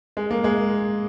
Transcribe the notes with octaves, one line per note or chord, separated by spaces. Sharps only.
G#3
A#3
G#3